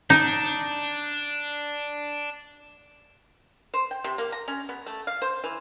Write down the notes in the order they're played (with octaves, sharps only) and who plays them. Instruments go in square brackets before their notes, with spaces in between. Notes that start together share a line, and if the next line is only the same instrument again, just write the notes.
[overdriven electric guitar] D4 [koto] D#4
[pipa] C5
G5
C3
A#3
A#5
C#4
B3
A3
F5
C5
E3